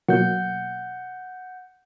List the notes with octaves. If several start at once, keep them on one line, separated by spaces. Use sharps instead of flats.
B2 F#3 A#3 F#5 G6